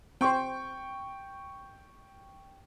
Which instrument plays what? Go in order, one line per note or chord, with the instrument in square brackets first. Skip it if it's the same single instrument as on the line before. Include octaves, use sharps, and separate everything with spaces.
[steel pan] C4 C5 [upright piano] G5 C#6